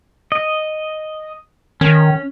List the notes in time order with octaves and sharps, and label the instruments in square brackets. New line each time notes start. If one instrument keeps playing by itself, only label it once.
[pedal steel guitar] D#5
[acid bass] D#3 [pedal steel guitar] C#4